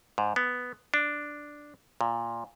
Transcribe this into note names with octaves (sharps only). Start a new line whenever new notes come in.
G#2
B3
D4
A#2